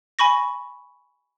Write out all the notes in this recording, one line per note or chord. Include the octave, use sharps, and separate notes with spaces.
G#5 B5 C#6 A#6